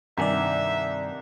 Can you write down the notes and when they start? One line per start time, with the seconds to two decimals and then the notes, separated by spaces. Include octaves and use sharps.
0.18 C2 G2 D#3 D5 E5 G#5 A#5